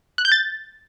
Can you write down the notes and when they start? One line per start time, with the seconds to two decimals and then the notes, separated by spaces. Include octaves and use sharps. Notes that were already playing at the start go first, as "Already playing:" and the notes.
0.18 F#6
0.25 G6
0.32 A6